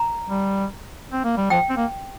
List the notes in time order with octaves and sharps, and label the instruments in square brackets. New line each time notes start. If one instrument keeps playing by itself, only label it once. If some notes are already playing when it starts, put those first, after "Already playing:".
Already playing: [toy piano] A#5
[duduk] G3
C4
A#3
G3
[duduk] F3 [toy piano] G5
[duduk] C4
A#3